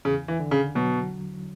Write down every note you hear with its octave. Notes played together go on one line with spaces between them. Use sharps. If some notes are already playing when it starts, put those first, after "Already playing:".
E2 C#3
E3
D3
C#3
B2 F#3